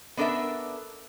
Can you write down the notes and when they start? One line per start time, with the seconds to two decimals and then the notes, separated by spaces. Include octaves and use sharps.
0.17 B3 D4 A4 A#4 E5